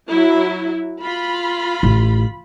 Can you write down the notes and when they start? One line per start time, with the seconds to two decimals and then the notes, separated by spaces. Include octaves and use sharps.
0.10 F#3 E4
1.02 F4 B5
1.83 A1